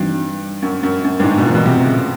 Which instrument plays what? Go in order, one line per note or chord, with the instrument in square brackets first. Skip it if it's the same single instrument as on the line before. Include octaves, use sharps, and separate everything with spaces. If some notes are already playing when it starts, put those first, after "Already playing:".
Already playing: [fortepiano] G2 [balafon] E3 G3 C4 D#4 F#4
[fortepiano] F#2
F#2
F#2
G2
G#2
B2
[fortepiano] A#2 [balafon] E3 G#3 B3 E4
[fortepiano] B2
C3
C#3